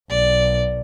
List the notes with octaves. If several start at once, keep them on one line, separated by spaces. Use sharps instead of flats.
B1 D5